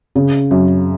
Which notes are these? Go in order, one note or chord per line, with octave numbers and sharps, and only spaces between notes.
C#3
F#2